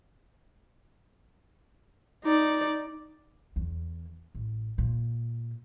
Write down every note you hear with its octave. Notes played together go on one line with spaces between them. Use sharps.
D#4 D5
E2
A1
A#2